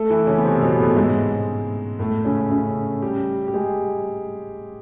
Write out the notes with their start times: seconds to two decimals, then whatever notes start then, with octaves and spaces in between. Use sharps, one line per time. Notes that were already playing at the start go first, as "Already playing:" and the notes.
Already playing: A3 A4
0.10 E3 E4
0.27 C#3 C#4
0.38 B3
0.44 C3 C4
0.62 B2 B3
0.79 A2 A3
0.96 G#2 G#3
1.99 A2 A3
2.25 C#3 C#4
2.50 C#3 C#4
3.02 G3 G4
3.48 G4
3.54 G#3 G#4